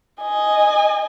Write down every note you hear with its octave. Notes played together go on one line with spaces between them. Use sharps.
D#5 G#5